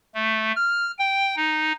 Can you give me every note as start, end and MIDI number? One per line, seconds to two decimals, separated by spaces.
0.15 0.52 57
0.56 0.91 89
0.99 1.35 79
1.36 1.72 63